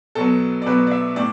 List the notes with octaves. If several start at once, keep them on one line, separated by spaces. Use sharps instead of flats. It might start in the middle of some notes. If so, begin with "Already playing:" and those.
B2 F#3 B3 A4
D5
B2 F#3 B3 B4
D5
E5
A2 D5